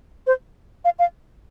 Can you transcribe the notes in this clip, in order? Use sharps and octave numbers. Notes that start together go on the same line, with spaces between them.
C5
F5
F5